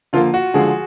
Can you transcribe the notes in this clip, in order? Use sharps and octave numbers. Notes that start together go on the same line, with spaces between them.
D3 F3 A#3 F4
F#4
D3 F3 G#3 G#4